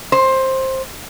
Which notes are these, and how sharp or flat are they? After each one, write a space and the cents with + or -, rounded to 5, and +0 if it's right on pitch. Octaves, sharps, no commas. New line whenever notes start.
C5 +15